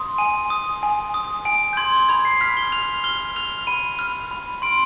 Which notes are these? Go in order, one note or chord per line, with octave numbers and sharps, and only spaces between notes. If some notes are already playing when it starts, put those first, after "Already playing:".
Already playing: C6 D#6
G#5 D#7
D#6
G#5
D#6
G#5 D7
G6
C6 G#6
B5 G#6
C7
F6 B6
G7
F6 F7
F6 G7
F6 F7
B5 D#7
F6
B5
C6 D7